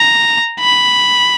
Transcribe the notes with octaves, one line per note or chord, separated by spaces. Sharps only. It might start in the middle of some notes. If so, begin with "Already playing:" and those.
Already playing: A#5
B5